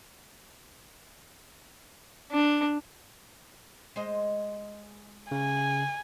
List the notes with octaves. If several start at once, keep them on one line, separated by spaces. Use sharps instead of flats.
D4
G#3 C5 D#5
C#3 G#5